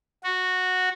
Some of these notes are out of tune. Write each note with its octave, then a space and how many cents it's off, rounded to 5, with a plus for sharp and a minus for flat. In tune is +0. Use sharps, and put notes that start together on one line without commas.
F#4 -10